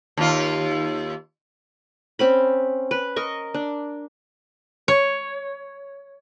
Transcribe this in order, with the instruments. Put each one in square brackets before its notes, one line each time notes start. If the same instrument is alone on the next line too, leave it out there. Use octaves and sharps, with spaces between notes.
[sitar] D#2 F4
[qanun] C4 C#4 B5
B4
A#4 D#5 C#6
D4
[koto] C#5